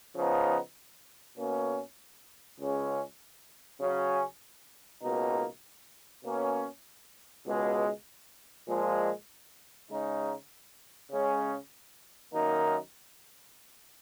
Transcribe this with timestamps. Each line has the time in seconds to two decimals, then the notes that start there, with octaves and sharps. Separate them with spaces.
0.15 C#3 F3 B3 D#4
1.37 B2 A#3 C#4
2.59 C#2 C#3 G#3 C#4
3.80 C#3 F#3 C#4
5.02 C#2 B2 A#3 D#4
6.24 B2 A#3 C#4
7.46 C#2 B2 G#3
8.68 A#2 F3 G#3
9.90 C#3 G#3 D#4
11.12 C#3 G#3 C#4
12.33 F#2 D#3 A#3 D#4